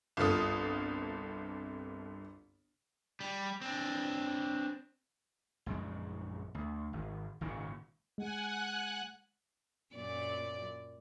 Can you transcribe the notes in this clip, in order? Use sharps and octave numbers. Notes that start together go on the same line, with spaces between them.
G1 C2 C3 F4 A4 D#6
G3
C4 D4
A#1 F#2 C#3 G#3
D2
G#1
G#1 A#2 C#3
G#3 F#5 G#5 F#6
F#2 A#2 D5